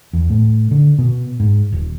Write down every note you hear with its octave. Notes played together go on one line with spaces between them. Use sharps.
E2
A2
D3
B2
G#2
D#1